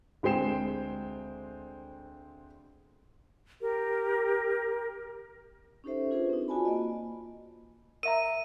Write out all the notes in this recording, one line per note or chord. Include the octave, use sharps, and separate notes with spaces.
D2 G#3 C4 G5 C7 E7
G4 A#4
C#4 D#4 G4 A4 C5 E5
D4 F4 G#4 B4 C5
C4 D#4
F4 F#4 D5 G#5 A5 B5
A#3 D#5
A#4 E5 A#5 D#7